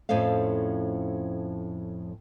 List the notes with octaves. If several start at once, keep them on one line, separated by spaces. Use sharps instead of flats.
F2 A2 F3 C#4 A4 F5